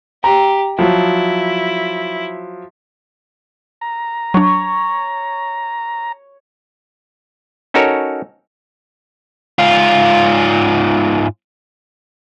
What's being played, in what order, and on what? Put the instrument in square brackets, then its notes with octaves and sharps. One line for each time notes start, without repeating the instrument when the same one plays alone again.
[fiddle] G4 [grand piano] A#5
[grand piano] F3 F#3 [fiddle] E4
[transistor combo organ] A#5
[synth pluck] F#3 D4 [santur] C#5
[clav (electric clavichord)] C#4 D#4 F#4 A4 A#4 C#5
[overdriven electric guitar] G#2 F4